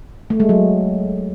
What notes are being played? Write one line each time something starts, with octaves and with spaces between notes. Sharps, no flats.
A3
G#3
F#3